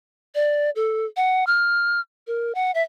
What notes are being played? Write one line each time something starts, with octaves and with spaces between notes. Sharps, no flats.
D5
A4
F#5
F6
A#4
F#5
E5